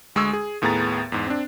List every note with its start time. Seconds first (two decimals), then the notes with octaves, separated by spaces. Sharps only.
0.16 D2 G#3 G#4 C#6 E6
0.33 G#4
0.62 D#2 A2 B3 G#4 A#5 A6
1.12 E2 G#2
1.27 C4 D4